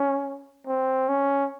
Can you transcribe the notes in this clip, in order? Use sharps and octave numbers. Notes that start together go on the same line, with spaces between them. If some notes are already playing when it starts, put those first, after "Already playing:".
Already playing: C#4
C4
C#4